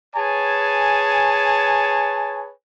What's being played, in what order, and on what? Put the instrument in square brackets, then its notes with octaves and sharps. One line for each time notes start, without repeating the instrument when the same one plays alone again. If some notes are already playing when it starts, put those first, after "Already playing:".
[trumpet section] G#4 B4 C#5 G#5 A5